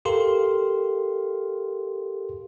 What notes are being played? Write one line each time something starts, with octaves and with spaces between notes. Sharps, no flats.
G4 A4 A#4 F5 C6